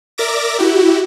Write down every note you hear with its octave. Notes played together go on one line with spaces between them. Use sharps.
A#4 D5 E5 D6 A#6
E4 F#4 G4